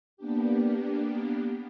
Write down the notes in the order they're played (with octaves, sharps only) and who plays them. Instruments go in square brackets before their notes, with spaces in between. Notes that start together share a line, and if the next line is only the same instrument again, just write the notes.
[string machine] A#3 B3 D4 G4